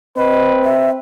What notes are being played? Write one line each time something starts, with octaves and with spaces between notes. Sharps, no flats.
C4 B4 D#5
E5